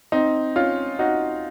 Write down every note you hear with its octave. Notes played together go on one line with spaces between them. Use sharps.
C4 D#4
C#4 F4
D#4 F#4